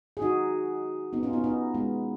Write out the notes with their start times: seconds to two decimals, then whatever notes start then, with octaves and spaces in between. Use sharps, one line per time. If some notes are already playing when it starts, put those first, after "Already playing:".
0.17 G#4
0.22 D#4 F#4
1.13 B3 D#4
1.23 C#4 F4
1.33 B3 D#4
1.44 B3 D#4
1.74 G#3 B3